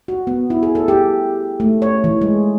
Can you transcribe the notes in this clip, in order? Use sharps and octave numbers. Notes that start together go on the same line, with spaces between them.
F#4
B3
E4
G#4
A4
G4
A3
C#5
E3
G#3